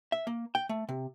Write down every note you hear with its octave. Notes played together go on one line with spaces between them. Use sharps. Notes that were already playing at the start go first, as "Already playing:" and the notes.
E5
A#3
G5
A3
C3